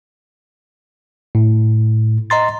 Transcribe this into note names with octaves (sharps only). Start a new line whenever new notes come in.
A2
D#5 A#5 C6 A6